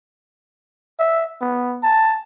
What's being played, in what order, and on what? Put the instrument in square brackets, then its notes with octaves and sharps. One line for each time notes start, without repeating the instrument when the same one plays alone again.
[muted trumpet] E5
B3
A5